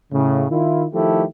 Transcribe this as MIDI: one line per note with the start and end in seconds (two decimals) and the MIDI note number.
0.12 0.45 45
0.12 0.45 49
0.50 0.85 51
0.50 0.85 64
0.50 0.85 65
0.93 1.24 51
0.93 1.24 53
0.93 1.24 57
0.93 1.24 64
0.93 1.24 67
0.93 1.24 69